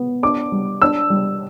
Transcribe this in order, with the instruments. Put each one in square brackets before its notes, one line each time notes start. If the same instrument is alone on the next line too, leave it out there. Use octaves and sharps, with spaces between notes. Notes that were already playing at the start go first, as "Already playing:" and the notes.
Already playing: [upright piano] B3
D4 D6
G3
D4 E6
G3